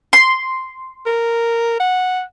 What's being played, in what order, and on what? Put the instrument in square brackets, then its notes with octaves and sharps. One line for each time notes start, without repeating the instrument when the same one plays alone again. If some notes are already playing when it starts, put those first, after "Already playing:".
[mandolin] C6
[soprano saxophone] A#4
F#5